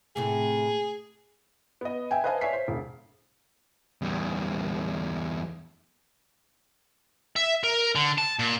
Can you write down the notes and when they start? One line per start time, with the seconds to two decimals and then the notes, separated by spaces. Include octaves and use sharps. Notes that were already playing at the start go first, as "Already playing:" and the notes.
0.16 A2 C3 A3 G#4
1.81 B3 D#5
2.11 E5 G5 G#5
2.24 B4 C5 D#5 F5 G#5 A5
2.41 C#5 D5 E5 G#5 B6 C7
2.53 C5
2.68 E1
4.02 E2 G3
7.36 E5
7.64 A#4
7.95 D3
8.18 A5
8.39 A#2